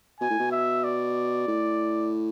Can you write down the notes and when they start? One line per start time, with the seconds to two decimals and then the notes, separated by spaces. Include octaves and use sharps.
0.20 B2 G#5
0.30 A2
0.39 B2
0.51 E5
0.84 D5
1.47 A2